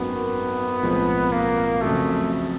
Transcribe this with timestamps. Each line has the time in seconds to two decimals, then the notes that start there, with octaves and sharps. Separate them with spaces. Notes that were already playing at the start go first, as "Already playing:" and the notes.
Already playing: G#1 F#2 D#3 F#3 A#3 B3
0.82 B1 A2 F3 G#3 C4
1.32 A#3
1.81 F2 C#3 F#3 A3